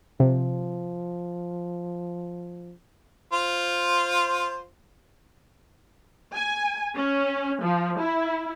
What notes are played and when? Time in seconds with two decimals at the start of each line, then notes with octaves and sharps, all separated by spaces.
0.20 C3 F3
3.33 F4 C5
6.32 G#5
6.94 C#4
7.61 F3
7.98 E4